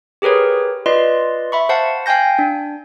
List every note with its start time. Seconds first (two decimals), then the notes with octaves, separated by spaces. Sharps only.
0.22 G4 G#4 A#4 B4 C#5
0.86 F4 B4 D5 D#5 C6
1.52 E5 B5 C#6
1.69 C5 F5 F#5 A5
2.06 F5 G5 G#5 G6 A#6
2.39 D4